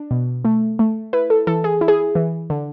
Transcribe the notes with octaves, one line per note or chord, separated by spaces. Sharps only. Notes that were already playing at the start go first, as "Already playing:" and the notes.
Already playing: D4
B2
A3
A3
E4 B4
A4
E3 A4
G#4
E4
G#4
E3
D3